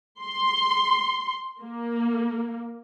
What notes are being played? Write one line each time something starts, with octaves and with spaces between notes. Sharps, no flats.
C6
A#3